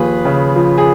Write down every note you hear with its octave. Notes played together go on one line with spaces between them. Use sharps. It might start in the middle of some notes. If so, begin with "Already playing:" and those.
Already playing: D#2 F3 G#4 B4
C#3
F3
G#4